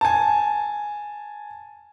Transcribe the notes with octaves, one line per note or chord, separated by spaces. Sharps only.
G#5 A5